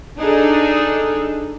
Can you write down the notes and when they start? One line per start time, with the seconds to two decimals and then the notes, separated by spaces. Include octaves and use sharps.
0.17 D4 D#4 G#4 A4